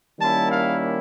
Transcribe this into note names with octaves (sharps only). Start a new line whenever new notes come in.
D#3 G3 A#3 C#4 E4 A5
F5